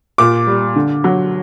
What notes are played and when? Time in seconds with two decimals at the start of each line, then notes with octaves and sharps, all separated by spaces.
0.18 A#2 D6
0.47 G3
0.76 D3
1.04 F#3